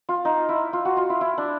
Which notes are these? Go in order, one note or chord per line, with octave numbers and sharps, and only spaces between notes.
F4
D#4
E4
F4
F#4
F4
E4
E4
D4